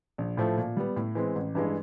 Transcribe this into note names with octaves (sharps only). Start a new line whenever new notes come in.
A#1
A2 F3 A3
A#2
G3 B3
A2
E3 G#3 C4
A1
G2 E3 G#3